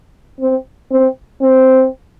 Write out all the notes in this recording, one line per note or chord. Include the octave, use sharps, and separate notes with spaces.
C4
C4
C4